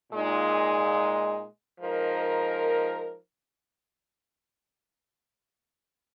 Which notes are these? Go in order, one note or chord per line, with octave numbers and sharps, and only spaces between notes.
A#2 G#3 D#4
F3 G#3 D#4 A#4